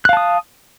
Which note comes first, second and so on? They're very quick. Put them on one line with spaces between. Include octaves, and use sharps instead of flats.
F#6 F5 A5 D#6